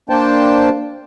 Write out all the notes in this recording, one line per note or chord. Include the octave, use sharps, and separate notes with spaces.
A#3 D4 C5 G5 A5